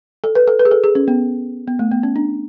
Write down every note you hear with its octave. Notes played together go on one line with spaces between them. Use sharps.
A4
B4
A4
B4
G#4
A4
G#4
C#4
B3
B3
A3
B3
C#4
D4